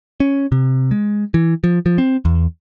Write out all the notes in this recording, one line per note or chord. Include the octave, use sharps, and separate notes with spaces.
C#4
C3
G#3
E3
F3
F3
C4
E2